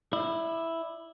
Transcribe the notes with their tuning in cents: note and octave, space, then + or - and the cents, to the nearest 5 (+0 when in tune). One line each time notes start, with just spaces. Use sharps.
E4 +0 D5 +35